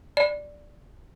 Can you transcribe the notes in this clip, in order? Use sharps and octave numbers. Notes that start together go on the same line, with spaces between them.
D5